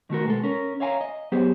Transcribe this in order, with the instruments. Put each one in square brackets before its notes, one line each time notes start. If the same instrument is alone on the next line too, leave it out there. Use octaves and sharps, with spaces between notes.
[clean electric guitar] D#3 A3 F#4 A#4
B2 G#3 A4
C#4 A#4
C#5 E5 F5 G#5 A#5
D#5
F#3 B3 G4 G#4 C5